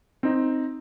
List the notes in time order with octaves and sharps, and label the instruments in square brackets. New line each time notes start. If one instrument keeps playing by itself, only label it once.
[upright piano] C4 D#4